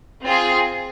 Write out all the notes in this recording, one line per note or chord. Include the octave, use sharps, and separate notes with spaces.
C4 F4 G#4